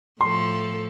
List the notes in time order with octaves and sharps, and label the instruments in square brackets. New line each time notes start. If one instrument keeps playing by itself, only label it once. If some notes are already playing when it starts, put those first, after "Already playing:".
[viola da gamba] A2 F3 A4 [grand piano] C6